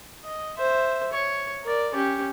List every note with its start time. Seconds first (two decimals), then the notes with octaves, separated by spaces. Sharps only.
0.24 D#5
0.57 C5 E5
1.13 C#5
1.64 A#4 D5
1.94 C#4 G4